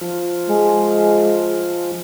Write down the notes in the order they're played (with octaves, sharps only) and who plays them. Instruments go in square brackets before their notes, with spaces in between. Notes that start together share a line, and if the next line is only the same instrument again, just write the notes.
[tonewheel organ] F3
[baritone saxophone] G#3